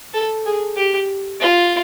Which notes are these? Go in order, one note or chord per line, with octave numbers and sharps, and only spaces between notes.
A4
G#4
G4
F4